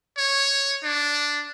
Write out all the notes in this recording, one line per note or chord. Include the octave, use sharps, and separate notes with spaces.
C#5
D4